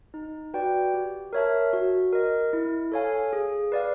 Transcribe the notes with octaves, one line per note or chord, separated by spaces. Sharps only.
D#4
F#4 B4 D5 G5
G4
A#4 C#5 E5 A5
F#4
A#4 D#5
E4
A4 C#5 F5 G#5
G#4
B4 D5 F5